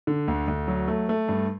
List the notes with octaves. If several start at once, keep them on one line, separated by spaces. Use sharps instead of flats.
D3
D2
D2
F#3
A3
A3
G2